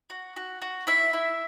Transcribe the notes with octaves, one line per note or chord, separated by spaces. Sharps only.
F#4
F#4
F#4
E4 E5
E4